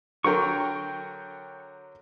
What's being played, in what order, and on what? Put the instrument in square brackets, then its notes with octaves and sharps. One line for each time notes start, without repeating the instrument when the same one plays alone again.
[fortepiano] D3 F#3 A#4 [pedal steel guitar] G5 C#6